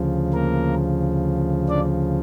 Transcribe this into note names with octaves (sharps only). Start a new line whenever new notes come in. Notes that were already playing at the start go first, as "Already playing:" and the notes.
Already playing: D2 C#3 F3
A#3 A#4
D4 D5